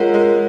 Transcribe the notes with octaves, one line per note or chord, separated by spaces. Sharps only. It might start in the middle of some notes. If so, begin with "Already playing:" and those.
Already playing: G#3 F4 A#4 C#5 F#5
G#3